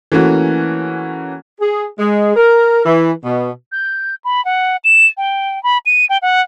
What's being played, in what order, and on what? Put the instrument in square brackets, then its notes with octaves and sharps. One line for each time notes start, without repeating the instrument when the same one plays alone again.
[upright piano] E3 A3 A#3 C#4 F#4
[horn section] G#4
G#3
A#4
E3
B2
[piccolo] G6
B5
F#5
E7
G5
B5
D#7
G5
F#5